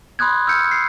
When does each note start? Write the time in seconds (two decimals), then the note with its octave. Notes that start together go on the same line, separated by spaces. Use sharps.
0.19 B5 C6 D#6 F#6 G#6
0.47 E6 F6 G6 C#7
0.71 C7